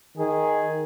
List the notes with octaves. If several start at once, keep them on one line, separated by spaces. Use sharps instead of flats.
D#3 G#4